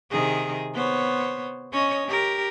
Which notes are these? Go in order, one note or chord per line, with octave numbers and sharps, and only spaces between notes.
C3 D#3 G#4
B3 C5 C#5
C#4 C#5 D#5
G4 A#4